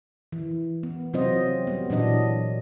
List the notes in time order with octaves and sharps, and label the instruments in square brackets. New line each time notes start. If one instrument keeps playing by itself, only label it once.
[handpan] E3
B3
C3 F#3 C4 F4 C5 D#5
G3 B3
A#2 E3 F#3 D4 D#5